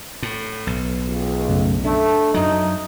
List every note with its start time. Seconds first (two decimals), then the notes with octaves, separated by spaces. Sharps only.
0.23 A2
0.67 B1
1.06 C#2
1.49 F#2 C#3 A3
1.85 A3 D4
2.34 F#2 F#3 D#4